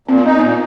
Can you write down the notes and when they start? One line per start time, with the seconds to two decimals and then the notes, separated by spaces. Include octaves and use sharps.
0.08 A#2 C4
0.18 B3
0.26 D#4
0.39 A#2 B3